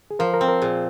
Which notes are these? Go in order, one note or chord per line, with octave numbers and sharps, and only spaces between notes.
G#4
F3 A#4
A#4
C4
A#4
A#2 G#4